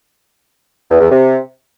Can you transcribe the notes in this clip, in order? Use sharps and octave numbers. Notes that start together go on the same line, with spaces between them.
E2
E2
C3